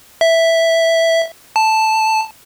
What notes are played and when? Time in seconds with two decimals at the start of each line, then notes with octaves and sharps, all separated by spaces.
0.21 E5
1.56 A5